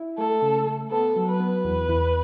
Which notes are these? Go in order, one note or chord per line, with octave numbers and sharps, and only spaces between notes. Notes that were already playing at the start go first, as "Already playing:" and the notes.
Already playing: E4
A3 A4
C#3
A3
B3 A4
F#3
B4
B3
E2
E2